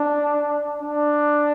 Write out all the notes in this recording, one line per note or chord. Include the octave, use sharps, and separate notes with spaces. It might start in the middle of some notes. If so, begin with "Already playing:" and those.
Already playing: D4
D4